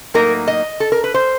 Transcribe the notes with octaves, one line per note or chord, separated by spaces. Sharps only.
A2 F#3 A#3 D#4 A#4
D#5
A4
A#4
B4
C5